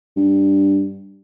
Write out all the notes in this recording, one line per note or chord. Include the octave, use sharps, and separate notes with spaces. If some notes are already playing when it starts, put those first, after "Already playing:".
G2